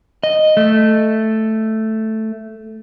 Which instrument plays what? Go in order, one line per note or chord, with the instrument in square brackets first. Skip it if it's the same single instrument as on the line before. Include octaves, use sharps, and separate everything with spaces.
[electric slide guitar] D#5
A3